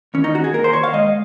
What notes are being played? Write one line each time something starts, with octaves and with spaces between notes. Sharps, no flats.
D#2 C#4
D#4
D#2 F#4
G#4
A#3 A#4
C5
D#2 C#5
F5
G#3 D#5